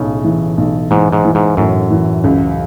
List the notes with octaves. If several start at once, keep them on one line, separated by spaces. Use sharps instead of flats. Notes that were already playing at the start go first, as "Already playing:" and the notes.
Already playing: B1 A2 C#3
E3
B1
G#2 E3
G#2
E3
G#2
F#2 A2
E3
C#2